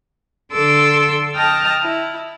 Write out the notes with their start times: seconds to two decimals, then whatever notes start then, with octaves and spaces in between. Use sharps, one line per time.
0.52 D3 A4 C6 D6 E6
1.34 D#5 G5 A5 D#6 F6
1.82 E4